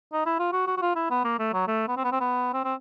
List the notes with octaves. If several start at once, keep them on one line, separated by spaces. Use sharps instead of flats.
D#4
E4
F4
F#4
F#4
F#4
F4
E4
B3
A#3
A3
F#3
A3
B3
C4
B3
C4
B3
C4
C4